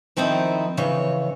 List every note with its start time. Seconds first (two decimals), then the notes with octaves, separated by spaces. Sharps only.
0.17 D#3 F3 C4 D#4 E4
0.77 F2 C#3 E3 C#5